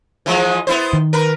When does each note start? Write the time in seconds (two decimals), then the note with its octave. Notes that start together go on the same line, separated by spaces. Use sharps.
0.26 E3 F3 G#3
0.67 B3 E4 C5
0.93 D#3
1.13 A#4 B4